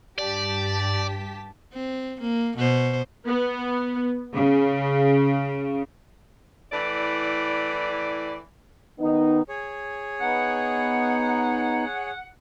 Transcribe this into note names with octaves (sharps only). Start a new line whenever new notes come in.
G2 G4 D5 A5 B6
C4
A#3
B2 C5
B3
C#3
A2 E3 D5
D#3 B3 D#4
G#4 C#5
B3 D#4 F#5